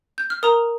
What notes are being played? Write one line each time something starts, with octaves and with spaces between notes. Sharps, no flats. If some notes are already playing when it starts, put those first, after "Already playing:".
G6
F6
A#4 A#5 D#6